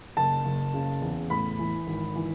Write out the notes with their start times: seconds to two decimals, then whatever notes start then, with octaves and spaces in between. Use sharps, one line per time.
0.17 F#1 A5
0.45 F#1
0.74 C#3
1.02 E2
1.30 A2 B5
1.59 E3
1.87 G#1
2.15 E3